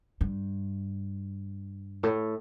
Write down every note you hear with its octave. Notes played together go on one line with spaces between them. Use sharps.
G2
A2